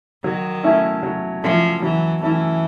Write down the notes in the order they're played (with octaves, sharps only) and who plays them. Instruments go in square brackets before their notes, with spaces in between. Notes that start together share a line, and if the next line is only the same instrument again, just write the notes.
[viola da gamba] D#3 [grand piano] F#3
[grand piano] A3 C#4 E4
F#3
[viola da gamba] F3 [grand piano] A3 C#4 E4
[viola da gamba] E3 [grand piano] F#3
[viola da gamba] E3 [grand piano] A3 C#4 E4